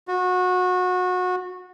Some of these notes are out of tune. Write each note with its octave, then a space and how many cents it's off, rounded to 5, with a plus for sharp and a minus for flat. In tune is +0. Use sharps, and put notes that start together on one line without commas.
F#4 -25